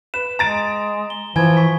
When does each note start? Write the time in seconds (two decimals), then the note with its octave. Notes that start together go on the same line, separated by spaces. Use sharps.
0.14 B4 E7
0.39 G#3 A#5 A6 D7
1.10 G7
1.36 E3 F3 G#5 G#6
1.57 C#6 B6